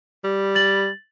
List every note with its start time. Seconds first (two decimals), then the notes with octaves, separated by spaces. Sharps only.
0.24 G3
0.55 A6 F#7